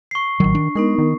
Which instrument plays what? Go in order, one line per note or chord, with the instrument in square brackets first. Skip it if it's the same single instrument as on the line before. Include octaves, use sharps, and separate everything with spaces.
[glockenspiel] C#6 C7
[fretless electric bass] A1 F#3 [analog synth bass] D#3
[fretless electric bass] D4
[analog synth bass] G#3 [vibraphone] B3 D#4 A#4
[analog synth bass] D#3